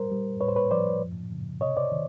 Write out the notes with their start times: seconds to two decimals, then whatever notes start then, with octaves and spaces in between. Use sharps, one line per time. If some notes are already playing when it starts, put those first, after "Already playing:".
Already playing: G3 A#4 C5
0.11 G3
0.41 A2 B4 C#5
0.49 C5
0.56 B4 C#5
0.71 F3 C5 D5
1.02 F#2
1.32 C#3
1.61 C3 C#5 D#5
1.77 C5 D5
1.92 D#3